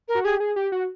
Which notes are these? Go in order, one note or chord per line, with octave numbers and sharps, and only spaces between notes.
A#4
F#4
G4 G#4
G#4
G4
F#4